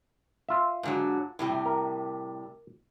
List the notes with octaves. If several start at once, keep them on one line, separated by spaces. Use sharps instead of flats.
F4 E5
G#2 D3 F#3
A2 C3 G3
A#4